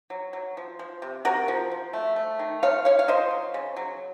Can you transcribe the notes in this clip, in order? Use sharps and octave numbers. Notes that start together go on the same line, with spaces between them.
F#3
F#3
F3
F3
C3
C3 F#4 A#4
F3
F3
A3
A3
D#3
F3 C#5 F5
F3 C#5 F5
F5
F3 C5 D#5
F#3
C#3
F#3